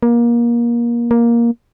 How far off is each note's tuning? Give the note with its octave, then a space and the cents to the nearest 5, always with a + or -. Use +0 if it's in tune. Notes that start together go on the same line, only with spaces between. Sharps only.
A#3 +25
A#3 +10